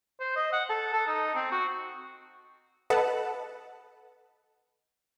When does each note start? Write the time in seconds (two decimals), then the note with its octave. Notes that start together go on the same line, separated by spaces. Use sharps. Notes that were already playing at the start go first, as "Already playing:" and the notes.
0.20 C5
0.36 D#5
0.53 F#5
0.69 A4
0.93 A4
1.07 D#4
1.35 C4
1.52 F#4
2.90 A4 B4 D#5 F#5 A5